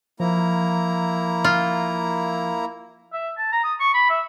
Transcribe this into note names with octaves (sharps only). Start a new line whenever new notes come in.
F3 A#3 E4 A#5
F4
E5
A5
A#5
D#6
C#6
B5
E5